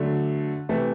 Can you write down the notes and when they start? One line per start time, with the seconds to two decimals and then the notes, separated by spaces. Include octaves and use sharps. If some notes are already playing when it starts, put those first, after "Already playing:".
Already playing: D3 F#3 A3
0.69 C3 E3 A3